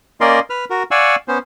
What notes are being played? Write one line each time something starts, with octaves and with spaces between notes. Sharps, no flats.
A#3 C#4 A#4 D5 D#5 C6
B4 F6
F#4 A#4
D5 F5 F#5 G#5 C#6 E6
B3 C#4 C5